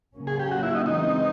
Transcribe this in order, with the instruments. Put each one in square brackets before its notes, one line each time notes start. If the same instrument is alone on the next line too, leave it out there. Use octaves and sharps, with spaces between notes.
[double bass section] C#3 F#3 A#3 C#4
[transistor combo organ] G#4
G4
F#4
E4
D#4
[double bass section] E3 G#3 C4 [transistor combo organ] D#4